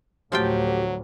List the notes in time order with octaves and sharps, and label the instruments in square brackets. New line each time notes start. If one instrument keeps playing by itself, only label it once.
[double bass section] D2 A2 [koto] F3 F4 G5 [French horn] F#3 [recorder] G4